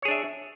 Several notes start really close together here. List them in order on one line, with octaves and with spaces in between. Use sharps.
C#5 G#4 D4 E5